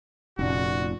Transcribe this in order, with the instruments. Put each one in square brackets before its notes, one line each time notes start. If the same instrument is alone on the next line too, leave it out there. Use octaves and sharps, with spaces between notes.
[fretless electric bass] F1 C#4 [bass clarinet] A#2 [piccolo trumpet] F#4